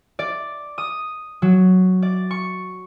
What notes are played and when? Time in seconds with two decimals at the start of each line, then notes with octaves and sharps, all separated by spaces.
0.19 D5
0.78 D#6
1.42 F#3
2.02 D5
2.31 C#6